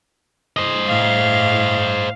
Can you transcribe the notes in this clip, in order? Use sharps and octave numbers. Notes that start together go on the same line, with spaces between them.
C5 D#5
A2 F5